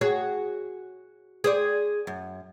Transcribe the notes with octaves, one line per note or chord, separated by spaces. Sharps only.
F#4 G#4 C#5
G#4 C5 D5
F#2